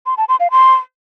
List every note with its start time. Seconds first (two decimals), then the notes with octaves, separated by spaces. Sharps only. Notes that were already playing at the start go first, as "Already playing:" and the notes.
0.06 C6
0.17 A5
0.29 C6
0.40 F5
0.51 C6